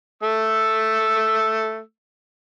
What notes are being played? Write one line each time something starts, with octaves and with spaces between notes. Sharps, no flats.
A3 E6